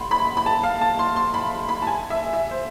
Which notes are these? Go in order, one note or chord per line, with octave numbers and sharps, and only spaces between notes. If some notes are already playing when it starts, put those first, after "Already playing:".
Already playing: B5 C6
B5
B5
A5
F5
A5
C6
C6
B5
C6
B5
A5
G#5
E5
E5
C5